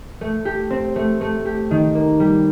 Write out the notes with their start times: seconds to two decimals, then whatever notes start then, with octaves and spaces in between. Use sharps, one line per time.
0.21 A3
0.45 G4
0.70 C4
0.96 A3
1.21 A3
1.45 G4
1.71 D#3
1.95 A#3
2.20 G3